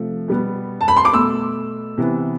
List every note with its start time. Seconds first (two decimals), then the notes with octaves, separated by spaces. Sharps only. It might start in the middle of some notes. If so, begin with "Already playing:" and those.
Already playing: C3 F3 A3
0.28 B2 G3 B3
0.81 A5
0.88 B5
0.97 C6
1.05 D6
1.13 B2 A3 E6
1.98 C3 E3 B3